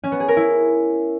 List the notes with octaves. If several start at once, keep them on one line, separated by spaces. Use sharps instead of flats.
C#4
B3
G#4
A#4
E4